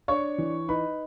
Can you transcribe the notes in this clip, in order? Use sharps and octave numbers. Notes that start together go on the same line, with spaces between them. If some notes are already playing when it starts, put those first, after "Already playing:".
D4 C#5 C#6
E3
D#4 B4 B5